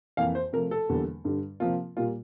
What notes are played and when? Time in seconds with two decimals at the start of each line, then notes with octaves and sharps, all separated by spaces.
0.17 F2 E3 A#3 F5
0.35 C5
0.53 C3 F3 A3 A#4
0.71 A4
0.89 E2 D3 G3 A#3
1.25 G2 D3 G3
1.60 C3 F3 A#3 F4
1.97 A#2 G3 A#3 F4